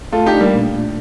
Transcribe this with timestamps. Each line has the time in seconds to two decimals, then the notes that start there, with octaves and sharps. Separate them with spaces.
0.12 A3 F4 A4
0.26 D#4 G4
0.33 D4
0.40 G3 A#3
0.54 A#2
0.74 A#2